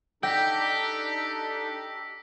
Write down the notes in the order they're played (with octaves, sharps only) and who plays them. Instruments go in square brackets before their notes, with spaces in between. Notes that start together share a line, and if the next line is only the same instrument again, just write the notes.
[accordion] D4 D#4 A4 [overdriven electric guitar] G4 [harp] G5 [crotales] E6 A#6 B6